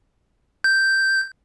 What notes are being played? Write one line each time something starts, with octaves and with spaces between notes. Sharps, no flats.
G6